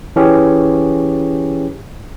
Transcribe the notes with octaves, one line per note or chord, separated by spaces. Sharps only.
E3 C#4 G4 G#4